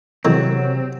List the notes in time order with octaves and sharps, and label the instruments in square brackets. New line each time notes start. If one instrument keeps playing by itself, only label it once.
[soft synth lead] C3 [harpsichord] E3 G#3 A#4 [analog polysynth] F#3 [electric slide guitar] C4